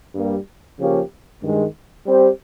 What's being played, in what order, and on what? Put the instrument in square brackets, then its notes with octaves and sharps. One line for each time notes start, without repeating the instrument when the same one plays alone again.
[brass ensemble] G2 G3 A#3
C#3 F3 A#3 C#4 G4
G2 D#3 G#3
G3 C4 G4 C5